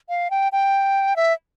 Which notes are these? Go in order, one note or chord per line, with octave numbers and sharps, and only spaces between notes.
F5
G5
G5
E5